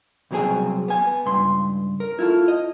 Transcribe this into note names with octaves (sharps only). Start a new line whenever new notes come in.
C2 B2 F#3 C4 G#4 G#5
B3 G#5
C#2 G2 C6
A#4
E4 F4 A4
D#5